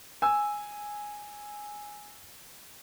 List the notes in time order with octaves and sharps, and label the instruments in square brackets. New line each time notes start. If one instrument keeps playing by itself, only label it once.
[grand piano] G#5 E6